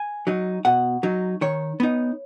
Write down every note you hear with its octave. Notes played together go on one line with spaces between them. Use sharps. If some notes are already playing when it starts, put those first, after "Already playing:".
Already playing: G#5
F#3 D#4
B2 F#5
F#3 D#4
D#3 C#5
B3 D#4